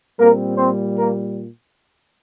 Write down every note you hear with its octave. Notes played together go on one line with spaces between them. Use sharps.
A#2 G3 A#3 C4 A#4
C4 C5
A#3 A#4